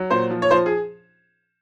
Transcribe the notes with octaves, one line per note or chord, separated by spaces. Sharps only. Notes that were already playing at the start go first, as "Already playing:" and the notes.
Already playing: F#3
A#2 C5
F3
C#5
F3 C5
G#4